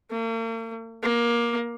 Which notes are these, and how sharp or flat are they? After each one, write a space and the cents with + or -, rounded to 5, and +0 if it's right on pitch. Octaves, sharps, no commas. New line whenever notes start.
A#3 -45
A#3 +20